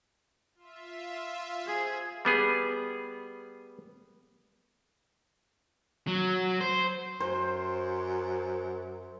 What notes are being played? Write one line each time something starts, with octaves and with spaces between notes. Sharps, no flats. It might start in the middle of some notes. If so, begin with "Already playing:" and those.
F4 E5
G#4 C5
G3 B3 G#4
F#3
C5
F#2 C5